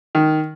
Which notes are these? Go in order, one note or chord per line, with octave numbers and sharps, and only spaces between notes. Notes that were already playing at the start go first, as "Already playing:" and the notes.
D#3